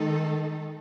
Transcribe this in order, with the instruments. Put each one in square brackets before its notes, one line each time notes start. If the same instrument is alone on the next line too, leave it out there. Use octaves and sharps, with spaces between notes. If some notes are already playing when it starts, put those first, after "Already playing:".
Already playing: [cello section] D#3 G#3 D#4 A4